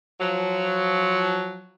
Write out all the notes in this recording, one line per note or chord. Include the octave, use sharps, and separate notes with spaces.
F3 F#3